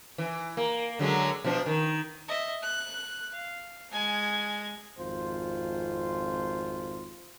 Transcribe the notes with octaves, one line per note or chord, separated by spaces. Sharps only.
E3
A#3
D3 F#3 G#3
B2 F3 D4
D#3
D#5 E5
F#6
F5
G#3 G#5
G#1 F2 F4 C5